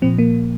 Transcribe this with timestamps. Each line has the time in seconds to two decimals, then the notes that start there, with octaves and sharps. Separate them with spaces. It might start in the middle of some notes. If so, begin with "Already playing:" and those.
0.02 A#2 F3 C4
0.19 A#3